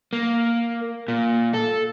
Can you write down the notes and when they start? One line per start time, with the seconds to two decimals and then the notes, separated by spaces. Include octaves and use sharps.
0.13 A#3
1.08 A#2
1.54 A4